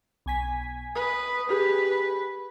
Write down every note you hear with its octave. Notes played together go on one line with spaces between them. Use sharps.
B1 G#5 B6
B4 D#6
G4 G#4 B4